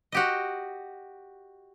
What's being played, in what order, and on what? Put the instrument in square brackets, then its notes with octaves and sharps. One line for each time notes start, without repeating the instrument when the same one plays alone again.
[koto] F#4 G4 D#5